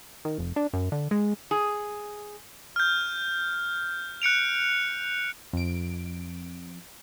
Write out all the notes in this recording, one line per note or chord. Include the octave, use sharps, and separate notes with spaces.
D#3
F1
D4
F#2
D3
G#3
G#4
F6 G6
F#6 C#7 D7 F7
F2 D7